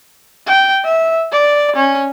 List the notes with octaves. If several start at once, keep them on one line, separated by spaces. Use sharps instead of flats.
G5
E5
D5
C#4